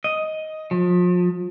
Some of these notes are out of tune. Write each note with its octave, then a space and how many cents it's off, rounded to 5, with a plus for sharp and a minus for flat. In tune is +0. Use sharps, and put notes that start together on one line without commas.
D#5 +10
F3 +35